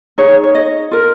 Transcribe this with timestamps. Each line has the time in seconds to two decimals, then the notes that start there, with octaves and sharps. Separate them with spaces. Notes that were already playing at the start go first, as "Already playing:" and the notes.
0.18 D#4 G#4 C#5
0.44 C#5
0.55 D#5
0.91 F4 A#4